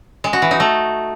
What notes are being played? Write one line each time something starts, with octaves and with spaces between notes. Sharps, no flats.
G#3
F#4
E3
D#4
A3